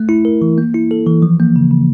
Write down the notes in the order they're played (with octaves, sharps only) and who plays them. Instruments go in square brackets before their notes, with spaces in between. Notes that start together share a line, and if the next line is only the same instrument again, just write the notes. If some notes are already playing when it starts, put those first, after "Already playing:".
Already playing: [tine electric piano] A3
E4
A#4
E3
A#3
E4
A4
E3
F3
A#3
C#3
C#3